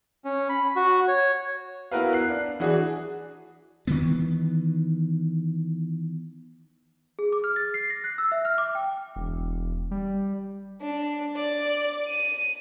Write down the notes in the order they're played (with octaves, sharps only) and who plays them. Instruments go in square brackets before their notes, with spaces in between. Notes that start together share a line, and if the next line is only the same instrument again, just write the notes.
[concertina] C#4
B5
F#4
C#5
[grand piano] B3 E4 F#4 A#4 B4 F5
F#6 C7
D4
E3 D4 F#4 G#4
[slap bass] D#3 E3 B3
[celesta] G#4
D6
F6
A6
C7
A#6
F#6
E6
E5
F6
D6
G5
[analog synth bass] E1
G3
[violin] D4
D5
D#7